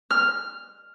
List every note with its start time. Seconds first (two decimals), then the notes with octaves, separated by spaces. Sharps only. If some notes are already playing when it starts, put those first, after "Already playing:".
0.11 F6